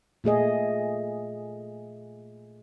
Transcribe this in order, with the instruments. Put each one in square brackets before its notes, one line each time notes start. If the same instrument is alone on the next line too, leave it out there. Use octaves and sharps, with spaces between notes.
[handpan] A#2 A3 G#4 D#5